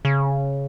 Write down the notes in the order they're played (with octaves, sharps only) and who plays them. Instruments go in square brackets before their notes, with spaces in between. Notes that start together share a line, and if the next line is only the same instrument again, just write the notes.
[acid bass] C#3